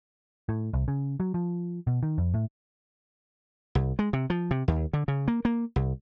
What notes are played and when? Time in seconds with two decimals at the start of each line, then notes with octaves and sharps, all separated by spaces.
0.49 A2
0.74 C2
0.88 C#3
1.20 F#3
1.34 F3
1.87 B2
2.03 D#3
2.18 F2
2.34 A2
3.75 C2
3.99 G#3
4.13 C3
4.30 F3
4.51 C3
4.68 D#2
4.93 D3
5.08 C#3
5.28 A#3
5.45 A#3
5.76 C2